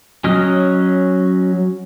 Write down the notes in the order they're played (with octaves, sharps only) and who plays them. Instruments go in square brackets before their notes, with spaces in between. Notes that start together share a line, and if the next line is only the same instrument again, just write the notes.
[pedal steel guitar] F#3 C#4 D#5 F6